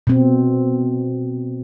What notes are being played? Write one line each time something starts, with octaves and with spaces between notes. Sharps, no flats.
B2 C4